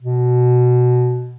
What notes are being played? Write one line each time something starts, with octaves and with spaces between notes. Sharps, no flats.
B2